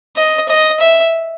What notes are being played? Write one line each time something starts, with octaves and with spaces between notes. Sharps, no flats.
D#5
D#5
E5